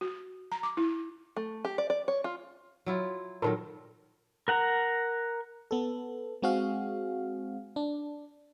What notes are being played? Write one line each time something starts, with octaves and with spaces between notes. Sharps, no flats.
F#4
A#5
D6
E4
A3
G4
D5
D5
C#5
F4
F#3 E4 F4
A#2 D#3 F#3 A4 A#4
A#4 F#5 A#5
B3 A4
G#3 C4 F#4 G#4 F5
D4